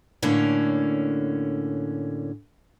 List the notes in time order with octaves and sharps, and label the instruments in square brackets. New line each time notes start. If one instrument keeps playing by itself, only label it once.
[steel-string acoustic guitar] A2 D3 A#3 C#4